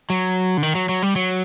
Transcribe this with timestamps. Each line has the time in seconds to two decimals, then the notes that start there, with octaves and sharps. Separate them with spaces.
0.10 F#3
0.57 D3
0.63 D#3
0.75 F#3
0.89 F#3
1.02 G3
1.16 F#3